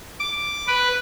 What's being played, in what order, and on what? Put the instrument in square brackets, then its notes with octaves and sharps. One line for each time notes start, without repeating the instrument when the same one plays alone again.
[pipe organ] D6
B4